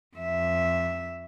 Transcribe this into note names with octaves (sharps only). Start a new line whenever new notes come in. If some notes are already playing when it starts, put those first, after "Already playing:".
F2 E5